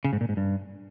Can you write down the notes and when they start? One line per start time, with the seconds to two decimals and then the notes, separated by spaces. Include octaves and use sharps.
0.05 C#3
0.13 G#2
0.21 A#2
0.29 G#2
0.37 G2